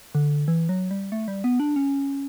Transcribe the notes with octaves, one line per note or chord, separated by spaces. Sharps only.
D3
E3
F#3
G3
A3
G3
B3
D4
C#4